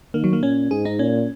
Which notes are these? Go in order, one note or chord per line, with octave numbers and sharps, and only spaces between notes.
D#3 A#3
F#3
A#3
A#2 C#4
G#2 G#4
D#4
A#2 C#4